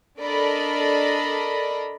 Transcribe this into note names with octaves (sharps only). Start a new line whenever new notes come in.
D4 A4 A#4 D5 D#5 B5